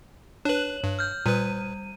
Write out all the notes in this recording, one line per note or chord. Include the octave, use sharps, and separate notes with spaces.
D4 B4 C#5 F#7
G2
F6 G6
A#2 G3 B4 D#7